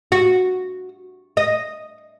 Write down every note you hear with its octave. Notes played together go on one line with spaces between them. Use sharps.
F#4
D#5